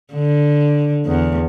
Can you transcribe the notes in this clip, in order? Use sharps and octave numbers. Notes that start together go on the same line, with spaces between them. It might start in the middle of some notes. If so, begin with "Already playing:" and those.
D3
E2